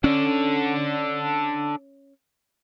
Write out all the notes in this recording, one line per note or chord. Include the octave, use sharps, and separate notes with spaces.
C#4 D4 A4